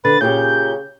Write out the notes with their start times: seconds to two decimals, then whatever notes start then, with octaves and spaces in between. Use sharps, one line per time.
0.05 D3 B4 A6
0.21 A#2 C#3 C#4 G4 G6